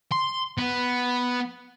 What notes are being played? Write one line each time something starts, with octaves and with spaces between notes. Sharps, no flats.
C6
B3